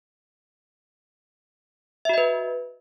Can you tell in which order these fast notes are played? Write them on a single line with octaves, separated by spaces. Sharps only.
E5 F#4 D#5 B4